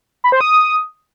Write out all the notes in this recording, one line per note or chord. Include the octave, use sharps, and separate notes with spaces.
B5
C5
D#6